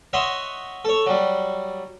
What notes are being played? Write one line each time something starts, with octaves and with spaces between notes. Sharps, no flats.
C#5 D#5 E5 F#5 C6
A4 C#5
F#3 G3